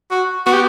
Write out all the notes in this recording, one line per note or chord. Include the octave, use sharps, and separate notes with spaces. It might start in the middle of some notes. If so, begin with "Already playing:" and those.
F#4
B3 F#4
G4